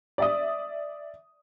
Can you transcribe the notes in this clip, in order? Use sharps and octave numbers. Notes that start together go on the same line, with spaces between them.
D5 E5 D#6